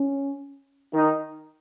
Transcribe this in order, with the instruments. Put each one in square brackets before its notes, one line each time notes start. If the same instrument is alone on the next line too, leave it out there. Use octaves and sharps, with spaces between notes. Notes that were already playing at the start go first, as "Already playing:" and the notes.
Already playing: [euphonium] C#4
[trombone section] D#3 D#4